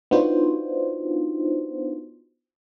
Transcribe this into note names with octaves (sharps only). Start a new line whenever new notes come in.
B3 D4 D#4 F4 F#4 C5